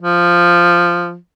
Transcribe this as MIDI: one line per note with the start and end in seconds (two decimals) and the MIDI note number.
0.01 1.17 53